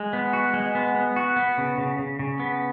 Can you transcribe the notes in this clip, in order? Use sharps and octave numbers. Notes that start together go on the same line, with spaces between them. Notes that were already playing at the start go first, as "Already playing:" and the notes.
Already playing: G#3
B3
F#4
G#3
B3
B3
F#4
B3
C#3
C#3
C#3
C#3
B3